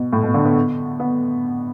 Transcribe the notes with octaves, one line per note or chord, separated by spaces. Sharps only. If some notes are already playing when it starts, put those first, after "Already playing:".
Already playing: B2
A2
B2
D3
B3
B3